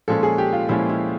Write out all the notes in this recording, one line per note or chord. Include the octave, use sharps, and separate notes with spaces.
A#2 F3 G#3 C#4 A4
G#4
G4
F4
A#2 F3 G#3 C#4 E4
E4